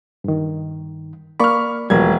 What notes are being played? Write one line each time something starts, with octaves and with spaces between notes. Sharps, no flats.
G2 D#3
A#3 D5 B5 C#6 F6
E1 F3 G3 A#3 G#6